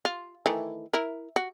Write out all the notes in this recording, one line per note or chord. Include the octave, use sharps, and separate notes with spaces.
F4
D#3 E3 A3
E4 A#4
F#4